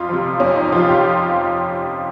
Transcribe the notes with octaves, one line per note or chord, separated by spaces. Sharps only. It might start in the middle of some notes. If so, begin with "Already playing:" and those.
Already playing: F2 F4
C3 F3
F2 C#4
D#4
C3 F3 F4
G4